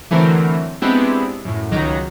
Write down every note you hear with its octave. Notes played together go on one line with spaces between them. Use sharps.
D3 E3 F#3 A3 C4 A#4
G#3 B3 C4 D4 E4 G4
F#2 A2
C#2 D#3 F#3 A#5